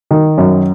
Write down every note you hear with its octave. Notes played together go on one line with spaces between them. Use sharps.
D#3
F#2